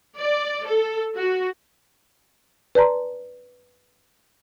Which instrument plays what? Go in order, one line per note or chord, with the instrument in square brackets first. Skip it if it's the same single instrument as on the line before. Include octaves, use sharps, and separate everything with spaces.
[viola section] D5
A4
F#4
[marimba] B4 D5 A5 A#5 C6